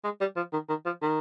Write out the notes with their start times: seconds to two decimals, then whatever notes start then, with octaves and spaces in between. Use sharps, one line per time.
0.04 G#3
0.20 G3
0.36 F3
0.53 D#3
0.69 D#3
0.86 F3
1.02 D#3